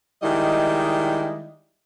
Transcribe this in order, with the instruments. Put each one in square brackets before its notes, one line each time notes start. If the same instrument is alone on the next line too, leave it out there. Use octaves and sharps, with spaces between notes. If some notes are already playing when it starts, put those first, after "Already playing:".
[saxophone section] D#3 G3 G#3 E4 D#5